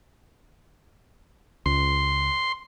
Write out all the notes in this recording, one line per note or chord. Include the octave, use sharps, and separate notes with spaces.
C#2 C6